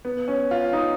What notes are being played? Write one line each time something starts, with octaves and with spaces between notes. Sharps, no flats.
B3
C#4
F4
D#4